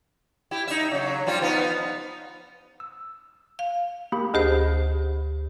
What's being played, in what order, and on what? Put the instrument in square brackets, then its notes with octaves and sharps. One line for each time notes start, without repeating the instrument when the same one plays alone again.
[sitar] E4 G4
D#4 E5
C#3 F#3
F3 G3 F4
F3 B3 D#4
[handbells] E6
[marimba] F5
[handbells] A#3 G4 B5
[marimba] D2 G4 C5 [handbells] D4 G#4 D#5